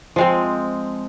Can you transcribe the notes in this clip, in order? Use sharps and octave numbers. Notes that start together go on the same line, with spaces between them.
F3 G#3 C4